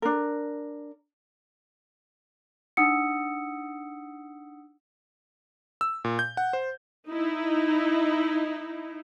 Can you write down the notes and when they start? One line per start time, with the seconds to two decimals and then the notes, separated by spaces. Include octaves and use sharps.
0.02 D4 A#4
2.77 D4 D#4 F#5 D#6 E6 C#7
5.81 E6
6.04 A#2
6.19 G6
6.37 F#5
6.53 C5
7.09 D#4 E4